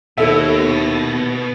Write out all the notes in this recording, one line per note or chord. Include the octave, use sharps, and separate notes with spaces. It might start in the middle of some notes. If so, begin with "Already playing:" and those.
D#2 B2 E4 A4 E5